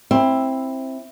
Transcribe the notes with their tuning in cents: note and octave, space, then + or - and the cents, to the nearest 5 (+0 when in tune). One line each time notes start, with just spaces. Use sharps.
C4 +15 E4 +0